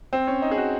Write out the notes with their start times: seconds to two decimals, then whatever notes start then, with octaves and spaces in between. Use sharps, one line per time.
0.13 C4
0.27 C#4
0.42 D#4
0.51 G#4
0.58 F#4